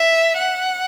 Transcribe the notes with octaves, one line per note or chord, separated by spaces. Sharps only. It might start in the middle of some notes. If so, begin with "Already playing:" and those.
Already playing: E5
F#5